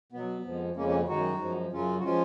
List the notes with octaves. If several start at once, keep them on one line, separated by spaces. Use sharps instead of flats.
B2 F#3 B3
F2 F3 G#3
F2 C#3 G#3 A#3 C#4
A#3 C#4
F#2 D#3 G#3 D#4 F#4
F#2 F3 G#3
F#2 C#3 F#3 C#4 F4
F#4
F3 G#3 C#4 F4